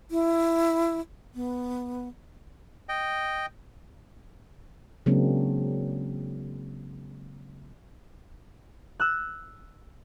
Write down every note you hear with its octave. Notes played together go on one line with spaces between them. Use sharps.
E4
B3
D#5 G5
C#3 F#3 G#3 A#3 C4 D4
E6 F#6